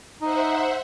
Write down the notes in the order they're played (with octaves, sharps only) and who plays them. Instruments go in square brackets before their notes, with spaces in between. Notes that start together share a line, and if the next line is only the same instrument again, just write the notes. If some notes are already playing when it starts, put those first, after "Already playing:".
[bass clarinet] D#4 [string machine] C5 E5 F#5